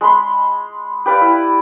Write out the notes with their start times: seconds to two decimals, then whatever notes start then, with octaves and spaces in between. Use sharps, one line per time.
0.01 G#3 B5 C6
1.06 G4 B4 D5 F5
1.21 E4